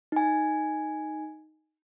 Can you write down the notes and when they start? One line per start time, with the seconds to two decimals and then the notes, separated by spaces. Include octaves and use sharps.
0.12 D#4 G#5